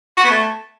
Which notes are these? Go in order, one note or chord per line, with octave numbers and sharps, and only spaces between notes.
F#4
B3
A3